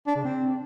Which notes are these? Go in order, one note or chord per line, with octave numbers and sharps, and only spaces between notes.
D4
C#3
C4